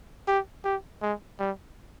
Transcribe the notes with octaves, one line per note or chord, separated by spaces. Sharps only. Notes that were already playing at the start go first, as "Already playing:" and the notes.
G4
G4
G#3
G3